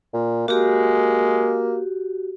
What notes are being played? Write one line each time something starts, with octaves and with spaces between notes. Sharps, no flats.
A#2
G#3 A#3 F#4 G4